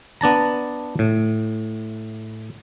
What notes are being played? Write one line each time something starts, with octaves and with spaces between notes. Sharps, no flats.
B3 D4 A5 A#5
A2